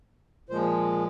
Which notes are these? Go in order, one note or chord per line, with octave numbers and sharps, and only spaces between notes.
A#2 F3 G#3 C5